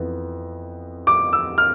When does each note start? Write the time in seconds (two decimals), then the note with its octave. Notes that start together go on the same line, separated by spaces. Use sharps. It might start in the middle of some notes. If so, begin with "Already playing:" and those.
Already playing: F2 E3 B3
1.07 D6
1.33 E6
1.58 F6